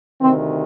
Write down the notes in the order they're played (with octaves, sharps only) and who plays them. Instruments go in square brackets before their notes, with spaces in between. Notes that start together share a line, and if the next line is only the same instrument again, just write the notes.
[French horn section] D2 C3 D#3 C4